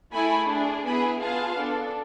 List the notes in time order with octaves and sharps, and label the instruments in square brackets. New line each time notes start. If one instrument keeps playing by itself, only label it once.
[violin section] A3 E4 G#4 G#5 B5
D4 G#4
B3 E4 G#4 G#5 B5
B3 F4 G#4 F5 A5
D4 A4